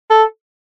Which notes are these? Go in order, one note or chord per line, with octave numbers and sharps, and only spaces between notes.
A4